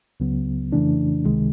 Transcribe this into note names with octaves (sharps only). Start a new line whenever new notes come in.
C#2 C#3 F#3 B3
F2 C#3 E3 A3 D4
C#2 C3 D#3 G#3